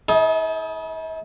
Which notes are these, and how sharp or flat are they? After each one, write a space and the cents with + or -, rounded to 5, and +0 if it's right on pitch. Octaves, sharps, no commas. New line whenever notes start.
E4 -45 A4 -40 D#5 +15